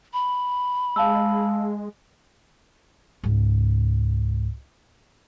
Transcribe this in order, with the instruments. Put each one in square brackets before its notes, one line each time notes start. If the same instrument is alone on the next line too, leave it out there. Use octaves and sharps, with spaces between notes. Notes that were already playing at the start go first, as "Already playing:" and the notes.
[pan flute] B5
[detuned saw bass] G#3 [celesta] F5 A5 E6
[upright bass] C#2 G#2